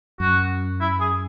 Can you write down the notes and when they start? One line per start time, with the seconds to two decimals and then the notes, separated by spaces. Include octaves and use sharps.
0.20 F#2 F#4
0.81 E4
1.00 G#4